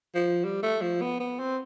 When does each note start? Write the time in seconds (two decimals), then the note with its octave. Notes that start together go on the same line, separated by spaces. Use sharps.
0.15 F3
0.44 G3
0.63 A3
0.82 F3
1.01 B3
1.20 B3
1.39 C4